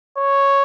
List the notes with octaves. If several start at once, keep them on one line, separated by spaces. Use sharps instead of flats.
C#5